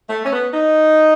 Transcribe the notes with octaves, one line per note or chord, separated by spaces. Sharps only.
A3
C#4
B3
D#4